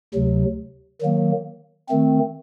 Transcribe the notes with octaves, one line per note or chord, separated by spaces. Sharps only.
D2 C3 F#3
D#3 F#3 A#3
D#3 A3 C4